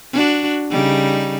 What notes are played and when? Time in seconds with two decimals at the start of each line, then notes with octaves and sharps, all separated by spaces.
0.13 D4 F#4
0.71 C#3 G3 D#4